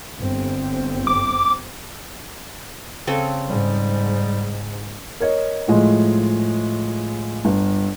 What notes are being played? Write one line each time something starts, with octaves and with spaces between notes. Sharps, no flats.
G1 C4
D6
C#3 C4 A4
G#2 G3
A#4 C#5 D#5
A2 F3 G#3
G1